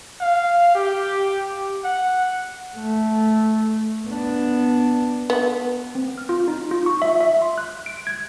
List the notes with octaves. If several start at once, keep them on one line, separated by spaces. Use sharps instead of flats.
F5
G4
F#5
A3
B3 D4
B3
C4
F6
F4
D#4
F4
C#6
E5
E5
C6
F#6
D7
G#6